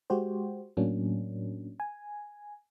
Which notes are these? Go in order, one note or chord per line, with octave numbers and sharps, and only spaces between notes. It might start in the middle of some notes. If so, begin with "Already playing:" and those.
G#3 F#4 G4 C5
A2 F#3 A#3 C#4 D4
G#5